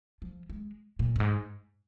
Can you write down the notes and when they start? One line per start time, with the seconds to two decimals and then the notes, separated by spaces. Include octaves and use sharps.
0.22 F3
0.50 G#3
0.99 A#2
1.16 G2
1.20 G#2